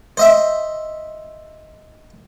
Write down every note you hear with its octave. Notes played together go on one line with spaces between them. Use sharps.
C5 D#5 E5